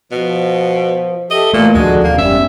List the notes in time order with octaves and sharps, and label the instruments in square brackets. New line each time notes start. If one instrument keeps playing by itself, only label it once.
[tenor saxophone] B2 [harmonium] F3
[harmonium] G4 A4 E5 [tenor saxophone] D#5
[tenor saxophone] A#2 [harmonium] E3 A#3 [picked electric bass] A3
[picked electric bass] D1 D#2 F3 [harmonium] D3 D4 F#4 [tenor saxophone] G#3
[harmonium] F2 C3 [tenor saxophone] A#3
[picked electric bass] F#1 C#4 [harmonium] E2 G#2 G3 [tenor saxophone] E5